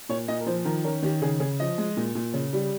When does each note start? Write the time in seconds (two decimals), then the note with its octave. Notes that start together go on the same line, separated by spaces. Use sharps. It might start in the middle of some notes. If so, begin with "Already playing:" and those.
0.09 A#2 C#5
0.28 A#2 D#5
0.40 A#4
0.46 F3 C5
0.65 D#3 A#4
0.84 C#4 A#4
1.02 D#3 G4
1.22 C#3 G#4
1.40 C#3 G#4
1.60 F3 D#5
1.78 G#3
1.97 A#2
2.15 A#2
2.34 C#3
2.53 G3